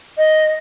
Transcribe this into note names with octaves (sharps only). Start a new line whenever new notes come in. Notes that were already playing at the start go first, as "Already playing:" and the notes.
D#5